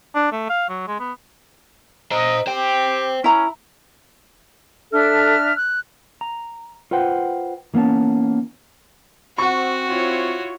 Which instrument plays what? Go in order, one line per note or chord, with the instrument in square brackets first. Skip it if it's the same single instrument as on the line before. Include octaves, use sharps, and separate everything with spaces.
[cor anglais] D4
A3
F5
F#3
G#3
B3
[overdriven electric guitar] C5 A#5 [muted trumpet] D#5
[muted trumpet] G4 [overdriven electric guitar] C5 G5
[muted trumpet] C#4 [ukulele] E4 A#5
[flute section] D4 E5 F6 [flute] A4
[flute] F#6
[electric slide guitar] A#5
F4 B4 C5 F#5 G5
E3 A#3 B3 C#4 A5
[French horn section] C4 [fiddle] F#4 [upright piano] F#5 C#6
[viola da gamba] E4 F4 C#5